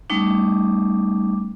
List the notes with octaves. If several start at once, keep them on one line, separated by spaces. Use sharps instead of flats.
G3 A3 B3 C#4 D#4 D6